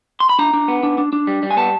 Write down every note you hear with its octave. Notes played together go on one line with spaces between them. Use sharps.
C6
B5
D4 A#5
D4
B3
D4
D4
D4
G3
G3
G#5
B3 A5